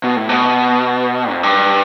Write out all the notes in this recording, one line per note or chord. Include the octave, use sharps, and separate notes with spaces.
B2
A2
B2
F2
G2